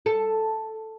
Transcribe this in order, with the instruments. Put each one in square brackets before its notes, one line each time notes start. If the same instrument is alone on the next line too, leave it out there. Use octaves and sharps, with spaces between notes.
[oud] A4